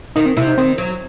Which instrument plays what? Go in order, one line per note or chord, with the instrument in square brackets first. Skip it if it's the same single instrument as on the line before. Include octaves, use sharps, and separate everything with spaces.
[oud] D#3 [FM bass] D#4
[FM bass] C4
[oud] C3 [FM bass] E4
[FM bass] D#4
[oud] D#3 [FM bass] C4
[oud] F#3